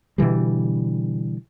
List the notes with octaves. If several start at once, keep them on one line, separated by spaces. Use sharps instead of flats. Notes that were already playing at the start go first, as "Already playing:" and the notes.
B2 D3 E3 G3